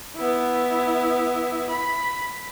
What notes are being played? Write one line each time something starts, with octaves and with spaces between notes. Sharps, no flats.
B3 E4
B5